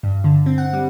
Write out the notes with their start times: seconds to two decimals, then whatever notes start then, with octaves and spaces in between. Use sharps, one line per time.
0.03 G2
0.24 D3
0.46 C4
0.58 F#5
0.73 G3